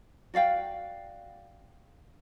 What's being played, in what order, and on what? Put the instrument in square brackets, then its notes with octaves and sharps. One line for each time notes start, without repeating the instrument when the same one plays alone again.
[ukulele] F#4 D5 F5 G5